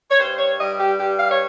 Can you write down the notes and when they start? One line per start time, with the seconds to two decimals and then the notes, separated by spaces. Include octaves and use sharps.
0.10 C#5
0.19 G2 C5
0.39 C#5
0.59 G3 D#5
0.79 G4
0.98 G2 G4
1.19 F5
1.31 C#5